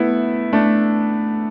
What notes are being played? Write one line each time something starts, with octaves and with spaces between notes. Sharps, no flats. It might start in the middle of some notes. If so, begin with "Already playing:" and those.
Already playing: A3 B3 E4
A3 D4